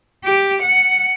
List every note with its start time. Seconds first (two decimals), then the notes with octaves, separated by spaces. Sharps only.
0.24 G4
0.62 F#5